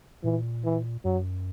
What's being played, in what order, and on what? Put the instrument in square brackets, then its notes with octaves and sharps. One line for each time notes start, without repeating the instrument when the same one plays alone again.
[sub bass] A#2 [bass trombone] E3
[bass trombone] E3
[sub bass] F#2 [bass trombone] F#3